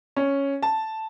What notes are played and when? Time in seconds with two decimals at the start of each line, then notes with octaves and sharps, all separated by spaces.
0.16 C#4
0.63 A5